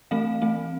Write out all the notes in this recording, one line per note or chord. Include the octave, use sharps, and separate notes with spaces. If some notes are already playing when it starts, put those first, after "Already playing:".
E3 A3 C4 F5
E3 A3 C4